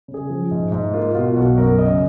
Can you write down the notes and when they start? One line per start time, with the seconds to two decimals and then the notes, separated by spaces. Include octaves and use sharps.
0.08 C#3
0.14 G#4
0.30 F3
0.51 G#2
0.72 G#2
0.94 A#3 F4
1.15 B2 F4
1.36 B1 F#4
1.58 F#2 A#4
1.79 C#3 D#5